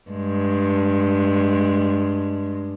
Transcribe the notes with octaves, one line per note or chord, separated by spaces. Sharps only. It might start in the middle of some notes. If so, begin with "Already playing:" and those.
G2 G#3